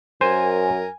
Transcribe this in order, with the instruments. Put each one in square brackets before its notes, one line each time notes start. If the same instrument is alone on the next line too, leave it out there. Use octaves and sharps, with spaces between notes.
[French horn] F#2 [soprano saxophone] A#4 [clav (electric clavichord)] C5 [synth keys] G#5